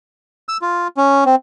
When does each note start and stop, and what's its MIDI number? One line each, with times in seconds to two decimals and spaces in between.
0.49 0.57 88
0.62 0.88 65
0.97 1.24 61
1.26 1.35 60